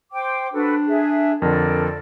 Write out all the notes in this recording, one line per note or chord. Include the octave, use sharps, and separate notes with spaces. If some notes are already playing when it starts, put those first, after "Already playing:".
C5 G5 D6
D4 F#4 A4 B4
G#4 E5
F2 D3 A4 A#4 D5